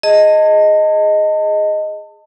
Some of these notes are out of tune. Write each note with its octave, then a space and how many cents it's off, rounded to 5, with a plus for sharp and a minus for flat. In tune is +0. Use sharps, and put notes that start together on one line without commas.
G#4 +0 D#5 +0 A5 +30